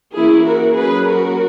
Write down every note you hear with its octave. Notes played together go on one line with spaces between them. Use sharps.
E3 A#3 C#4 E4 G#4
F#4 A#4
F#3 A#3 C#4 G#4 B4
F#4 A#4